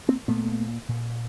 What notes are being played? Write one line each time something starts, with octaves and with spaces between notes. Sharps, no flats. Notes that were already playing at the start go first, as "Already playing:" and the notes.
A#3 C4
A#2 A3 B3
A#2